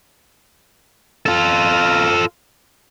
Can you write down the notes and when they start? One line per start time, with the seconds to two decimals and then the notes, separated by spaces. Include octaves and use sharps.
1.26 F4 A4